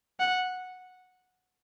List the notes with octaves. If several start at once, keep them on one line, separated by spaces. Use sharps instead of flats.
F#5